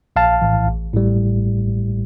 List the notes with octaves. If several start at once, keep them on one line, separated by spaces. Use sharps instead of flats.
A#1 F5 A5
A2 E3
A1
A2 G3